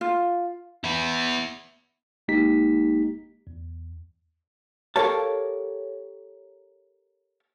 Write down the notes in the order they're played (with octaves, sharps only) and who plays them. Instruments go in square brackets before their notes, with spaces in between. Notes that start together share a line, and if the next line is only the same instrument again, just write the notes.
[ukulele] F4
[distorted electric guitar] B3 E4
[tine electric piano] G1 G#3 A#3 D#4 G4 B6
E2
[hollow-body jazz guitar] G4 A4 A#4 C#5 F5 A5